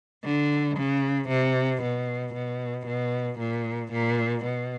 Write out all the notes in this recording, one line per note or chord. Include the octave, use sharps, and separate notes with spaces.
D3
C#3
C3
B2
B2
B2
A#2
A#2
B2